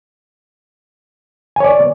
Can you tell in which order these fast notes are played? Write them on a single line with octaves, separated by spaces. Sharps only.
G#5 C#5 D5